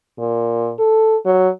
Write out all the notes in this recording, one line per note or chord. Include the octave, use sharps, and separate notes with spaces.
A#2
A4
F#3